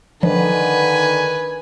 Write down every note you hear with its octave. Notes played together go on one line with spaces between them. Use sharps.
D3 D#3 F3 B4 G#5